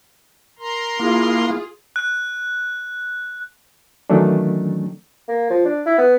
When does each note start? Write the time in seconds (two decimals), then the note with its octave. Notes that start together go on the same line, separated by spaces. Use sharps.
0.59 A#4 A#5 C6
0.99 A#3 E4 F4 G#4
1.96 F#6
4.10 D#3 E3 F#3 A3 C#4 D4
5.29 A#3
5.50 F3
5.65 D4
5.86 E4
5.98 B3